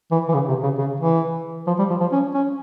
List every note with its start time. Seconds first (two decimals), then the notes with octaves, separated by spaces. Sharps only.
0.11 E3
0.29 E3
0.34 C#3
0.48 C3
0.63 C#3
0.78 C#3
1.00 E3
1.67 F3
1.79 G3
1.90 F3
2.00 F3
2.12 C#4
2.34 C#4